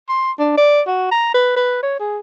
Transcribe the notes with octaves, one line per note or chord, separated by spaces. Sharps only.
C6
D4
D5
F#4
A#5
B4
B4
C#5
G#4